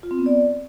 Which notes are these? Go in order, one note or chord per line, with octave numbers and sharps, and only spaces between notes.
F4
C4
B3
D5